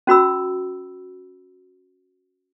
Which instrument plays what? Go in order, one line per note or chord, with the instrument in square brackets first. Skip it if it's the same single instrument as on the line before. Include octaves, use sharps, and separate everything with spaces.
[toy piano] C#4 F#4 B5 E6